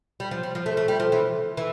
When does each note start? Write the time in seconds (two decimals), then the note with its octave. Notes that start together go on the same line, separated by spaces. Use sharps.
0.20 G3
0.31 F3
0.43 G3
0.55 F3
0.66 A3
0.77 A3
0.88 G3
1.00 F3
1.12 E3
1.57 E3